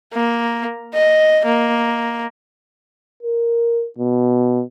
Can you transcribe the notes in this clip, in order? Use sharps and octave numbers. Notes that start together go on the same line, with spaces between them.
A#3
D#5
A#3
A#4
B2